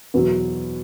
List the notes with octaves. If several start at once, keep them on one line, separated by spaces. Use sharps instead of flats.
E2 B2 F#3